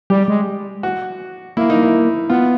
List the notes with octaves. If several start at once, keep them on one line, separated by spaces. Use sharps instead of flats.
G3 G4
G#3
F#4
A#3 E4
D#4
E4
B3 F4